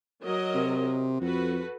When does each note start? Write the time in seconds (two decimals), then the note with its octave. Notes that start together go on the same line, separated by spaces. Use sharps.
0.22 F#3 A#4 D#5
0.55 C3
1.21 F2 F#4 A4 B4